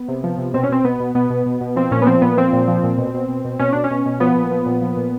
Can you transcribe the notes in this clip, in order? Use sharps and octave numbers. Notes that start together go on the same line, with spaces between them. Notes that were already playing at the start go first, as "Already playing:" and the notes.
Already playing: B3
C3
F3
C3
B2 C4
C#4
B2 C4
B2 B3
B2
B2 B3
B2
B2
B2
F3 C4
A#2 C#4
B3
F3 C4
A#2 B3
F3 C4
A#2
F3
A#2
B2
B2
B2
B2
B2 C#4
B2 D4
C#4
B2
B2
F3 B3
A#2
F3
A#2
F3
A#2